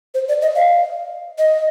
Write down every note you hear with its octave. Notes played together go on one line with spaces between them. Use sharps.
C5
D5
D#5
F5
D#5